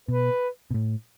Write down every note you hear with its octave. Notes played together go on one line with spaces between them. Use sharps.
B2 B4
B2
A2